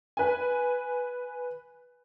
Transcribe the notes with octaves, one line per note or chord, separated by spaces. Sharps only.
B4 G#5